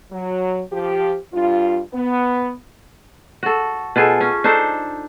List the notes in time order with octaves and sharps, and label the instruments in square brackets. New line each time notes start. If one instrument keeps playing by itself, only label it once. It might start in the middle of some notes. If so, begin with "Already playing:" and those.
[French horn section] F#3
F3 G4
G2 F4
B3
[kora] F#4 A4
B2 F4 G#4 A4
C#4
D4 D#4 A4 C5